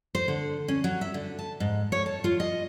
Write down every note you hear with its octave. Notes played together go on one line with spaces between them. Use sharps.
C5
D3
C#4
F#3
E5
D3
A5
G#2
C#5
A5
F4
D#5